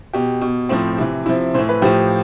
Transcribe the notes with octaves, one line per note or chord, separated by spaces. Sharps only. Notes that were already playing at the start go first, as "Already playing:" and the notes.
B2 G4
B2
A2 F3 C4
C3 E3
C3 F3 E4
A2 E3 C5
B4
A2 F3 G4